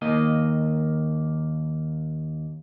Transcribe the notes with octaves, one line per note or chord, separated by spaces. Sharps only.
D#2 A#3 D#5